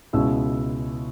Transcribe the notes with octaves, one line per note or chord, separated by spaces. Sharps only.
C#2 B2 G#3 C#4 E4 E6